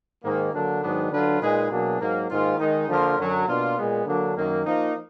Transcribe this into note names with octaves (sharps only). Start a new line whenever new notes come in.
G#2 D#3 A#3
D3 F#3 A#3 D4
G#2 D#3 F#3 B3 D4
D3 F#3 D4 F4 B4
A#2 G#3 D#4 G#4 B4
B2 F#3 A#3 D4 G#4
G#2 F#3 A#3
G#2 D#3 A#3 F4
D#3 G#3 D#4
D3 F3 A#3 F4 A#4
F#2 D3 F#3
B2 A#3 D4 F4
A#2 G#3 B3
D3 F#3 A#3 D4
F#2 D#3 A#3
F3 A#3 D#4